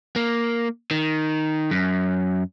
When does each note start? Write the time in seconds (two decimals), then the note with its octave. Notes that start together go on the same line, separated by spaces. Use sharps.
0.16 A#3
0.91 D#3
1.71 F#2